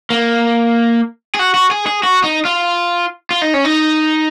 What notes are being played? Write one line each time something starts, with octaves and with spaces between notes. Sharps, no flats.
A#3
G#4
F#4
F#4
G#4
G#4
F#4
D#4
F4
F4
D#4
C#4
D#4